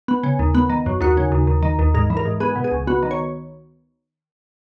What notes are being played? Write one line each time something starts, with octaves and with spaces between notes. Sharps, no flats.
B3
C#3
D#2
B3
D#3
F#2
D#2 F#4
C#3
D#2
D#2
D#3
D#2
G#2 A#4
E3
A#4
G#2
B3 G#4
B2
G#4
C#2
B3 F#4
D#3
C#5